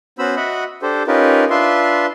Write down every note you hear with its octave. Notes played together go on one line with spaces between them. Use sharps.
B3 C#4 F#4 C5 B5 E6
F#4 D#5 E5 F#5 B5
D4 G4 A4 C5
C#4 D#4 F4 G4 A#4 B4
D4 F4 B4 E5 C6